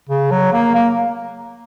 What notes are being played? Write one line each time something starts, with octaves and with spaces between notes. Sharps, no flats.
C#3
F#3
A#3
A#3